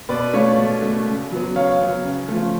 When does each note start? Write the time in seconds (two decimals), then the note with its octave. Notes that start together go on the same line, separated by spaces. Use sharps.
0.09 B2 B4 D5
0.34 A3 C#5 F5
0.58 B2
0.82 A3
1.07 C#3
1.31 F#3 B3
1.56 C#3 C#5 F5
1.81 F#3 B3
2.04 C#3
2.28 F3 A3